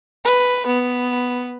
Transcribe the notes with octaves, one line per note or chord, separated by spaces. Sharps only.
B4
B3